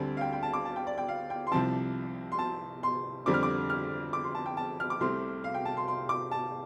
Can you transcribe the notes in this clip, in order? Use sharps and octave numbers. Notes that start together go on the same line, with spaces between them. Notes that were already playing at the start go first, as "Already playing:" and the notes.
Already playing: D2 D3 G3 C4 A5
F5
G5
G5
A5
D6
A5
G5
D5
G5
F5
G5
C6
C2 C3 F3 C4 A5
C6
A5
C6
F2 D3 G3 C4 D6
F6
D6
F6
D6
C6
A5
G5
A5
F6
D6
C2 C3 A3 C4 C6
F5
G5
A5
C6
C6
D6
A5